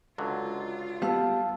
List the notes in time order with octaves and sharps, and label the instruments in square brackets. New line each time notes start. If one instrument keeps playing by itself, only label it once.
[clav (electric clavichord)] C#2 D3 F#3 [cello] F4
[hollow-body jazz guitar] G3 B3 [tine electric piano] F5 A5 E6